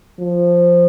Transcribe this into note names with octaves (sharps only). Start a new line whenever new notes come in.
F3